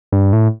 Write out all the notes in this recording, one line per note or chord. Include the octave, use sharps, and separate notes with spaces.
G2
A2